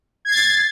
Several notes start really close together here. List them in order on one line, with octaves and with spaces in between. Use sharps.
G#6 C7 A6